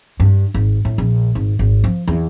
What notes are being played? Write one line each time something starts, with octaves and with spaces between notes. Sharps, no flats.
G2
G#1
A2
A#1
G#1
G#1
F3
E2